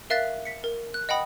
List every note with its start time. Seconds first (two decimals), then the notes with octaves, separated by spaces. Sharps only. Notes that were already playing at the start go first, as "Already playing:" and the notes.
0.10 A#4 E5 F5 F#6 A6
0.45 B6 C#7
0.64 A#4
0.94 F#6
1.09 D#5 F#5 G5 B5 D#6